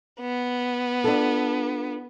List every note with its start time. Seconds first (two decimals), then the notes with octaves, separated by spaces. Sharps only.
0.21 B3
1.04 D4 F4 A4